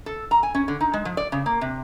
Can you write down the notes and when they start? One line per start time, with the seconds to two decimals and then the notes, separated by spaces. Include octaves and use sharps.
0.06 A4
0.31 A#5
0.43 G#5
0.55 C#4
0.68 D3
0.81 D#4
0.94 G#3
1.05 F3
1.17 D5
1.32 C#3
1.46 A#3
1.61 C3